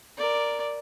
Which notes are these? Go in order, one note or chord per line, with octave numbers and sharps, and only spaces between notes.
A#4 D5